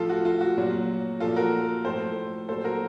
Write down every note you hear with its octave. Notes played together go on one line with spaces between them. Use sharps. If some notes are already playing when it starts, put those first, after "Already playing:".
Already playing: A2 F3 F4 A4
F#4
F4
F#4
A#2 F#3
A#2 F3 F4 A4
F#4 A#4
A2 F3 A4 C5
A#2 F#3 A4 C5
F#4 A#4